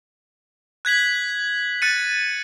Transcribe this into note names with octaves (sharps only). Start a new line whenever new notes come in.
F#6 G#6 B6 F#7
F#6 A6 C#7 D#7